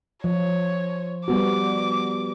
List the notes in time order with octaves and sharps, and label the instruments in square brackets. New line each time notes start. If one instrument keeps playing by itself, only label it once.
[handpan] F3 [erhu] C#5
[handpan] G3 B3 F#4 [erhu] D6